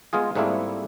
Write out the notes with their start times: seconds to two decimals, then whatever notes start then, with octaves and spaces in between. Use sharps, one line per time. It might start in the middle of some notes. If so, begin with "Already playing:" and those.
0.13 G#3 B3 F4 G#4
0.35 G#2 G3 A3 A#3 C4 E4